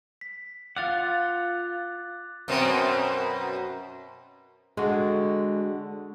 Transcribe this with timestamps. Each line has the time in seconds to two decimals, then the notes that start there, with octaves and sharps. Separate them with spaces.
0.21 B6
0.77 F4 F5 F#5 D6 F#6 A6
2.48 F#2 B2 C4
4.77 D3 G#3 F#4